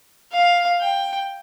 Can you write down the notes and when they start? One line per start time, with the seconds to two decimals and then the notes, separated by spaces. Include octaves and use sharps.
0.33 F5
0.81 G5